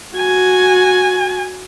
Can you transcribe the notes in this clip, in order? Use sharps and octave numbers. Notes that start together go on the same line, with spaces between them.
F#4 G#5